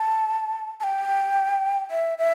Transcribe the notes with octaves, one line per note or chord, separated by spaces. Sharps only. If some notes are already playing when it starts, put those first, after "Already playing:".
Already playing: A5
A5
G5
E5
E5